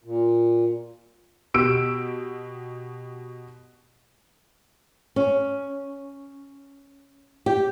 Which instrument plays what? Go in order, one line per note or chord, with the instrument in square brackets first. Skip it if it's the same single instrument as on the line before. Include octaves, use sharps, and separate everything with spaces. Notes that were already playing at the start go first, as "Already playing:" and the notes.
[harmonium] A#2
[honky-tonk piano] B2 G4 E6 D7
[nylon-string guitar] C#4
G4